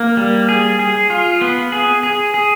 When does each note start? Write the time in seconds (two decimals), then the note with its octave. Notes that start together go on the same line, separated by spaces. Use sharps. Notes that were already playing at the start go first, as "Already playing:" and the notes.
Already playing: A#3
0.17 G3
0.49 G#4
0.79 G#4
1.10 F4
1.41 B3
1.72 G#4
2.03 G#4
2.34 G#4